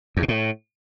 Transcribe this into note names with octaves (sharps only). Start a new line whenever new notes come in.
E2
B2
A2